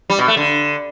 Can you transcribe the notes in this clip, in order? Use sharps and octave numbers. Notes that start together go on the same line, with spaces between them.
G3
B2
A3
D3